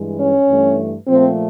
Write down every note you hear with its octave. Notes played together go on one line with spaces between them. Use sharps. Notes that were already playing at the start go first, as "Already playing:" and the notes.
Already playing: G2 E3 G#3
C#4
G2 E3 A3
A#2 F3 A3 C4